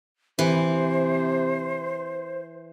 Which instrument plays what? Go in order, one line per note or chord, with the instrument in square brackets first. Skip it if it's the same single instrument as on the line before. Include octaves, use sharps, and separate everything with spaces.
[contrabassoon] C3 [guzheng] E3 [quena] C5